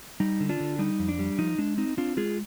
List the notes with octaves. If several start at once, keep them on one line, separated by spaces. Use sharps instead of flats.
G3 D#4
D3
D4 F4
D3
G3 D#4
F2
D4
G3
F3 D#4
G#3 D4
C4 D#4
C4 D4 F4
G#3 F4 G#4